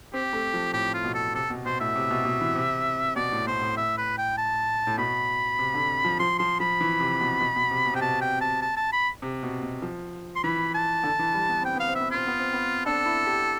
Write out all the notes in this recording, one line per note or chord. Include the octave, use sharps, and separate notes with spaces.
C4 G4
A3
F3
A2 G4
F4
B2
A4
C3 A4
B2
B2 C5
A2 E5
C3
B2
B2
E3
C3
B2 D5
A2
B2 C5
A2
E5
B4
G5
A5
A2
B2 B5
C3
D3
F3
F3 C6
F3 C6
F3 B5
E3
C3
B2
B2
B2
C3
B2
C3 G5
B2 A5
G5
A5
A5
A5
B5
C3
B2
B2
F3
C6
E3 B5
A5
D3
E3
G3
B3
C4 G5
B3 F5
C4
E5
B3
C4 F4
B3
C4
B3
D4 A4
E4
G4